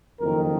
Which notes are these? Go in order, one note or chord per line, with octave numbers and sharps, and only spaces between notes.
F#1 F2 D#3 A#4